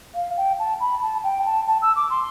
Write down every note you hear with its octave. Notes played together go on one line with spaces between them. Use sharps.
F5
G5
A5
B5
A5
G5
A5
A5
E6
D6
C6